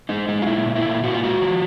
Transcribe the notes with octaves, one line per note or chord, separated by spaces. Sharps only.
G#3 D#4
G#3 D#4
F4
A#2 E4
A#2
E4
A#2
A#2 F#4
F4
G#3 F#4
F3